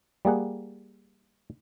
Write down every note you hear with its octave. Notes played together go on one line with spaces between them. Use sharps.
G3 A#3 G#4 F#5